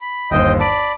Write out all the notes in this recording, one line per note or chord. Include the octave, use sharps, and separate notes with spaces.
B5
G1 D#2 C5 D#5 G5
D5 A5 B5 D7